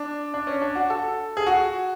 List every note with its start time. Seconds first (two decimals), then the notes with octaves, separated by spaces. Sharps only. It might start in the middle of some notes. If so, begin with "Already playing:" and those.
Already playing: D4
0.34 D4
0.47 C#4
0.62 D4
0.75 F#4
0.90 A4
1.37 G#4
1.47 F#4